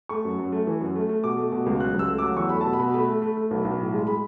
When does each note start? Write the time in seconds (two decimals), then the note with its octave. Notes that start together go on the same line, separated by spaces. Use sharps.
0.09 A3 C#6
0.25 F#2
0.38 F#2
0.52 A3
0.67 E3
0.81 F#2
0.95 A3
1.09 A3
1.24 B2 D6
1.37 A3
1.52 B2
1.66 C#2
1.80 F#3 F#6
1.94 C#2
1.99 E6
2.08 A3
2.18 F#3 D6
2.37 E2 C#6
2.49 A3 B5
2.61 A5
2.66 B2
2.73 B5
2.79 B2
2.94 A3 B5
3.08 A3
3.22 A3
3.37 A3
3.51 B1
3.65 B1
3.79 A2
3.93 G#3
4.07 G#3 B5